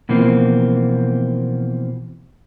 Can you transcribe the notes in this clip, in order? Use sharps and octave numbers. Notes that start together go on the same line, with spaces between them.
B2 E3 F3 A#3 C4